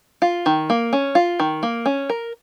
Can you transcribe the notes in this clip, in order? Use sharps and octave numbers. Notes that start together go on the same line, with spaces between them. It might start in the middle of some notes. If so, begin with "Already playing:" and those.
F4
D#3
A#3
C#4
F4
D#3
A#3
C#4
A#4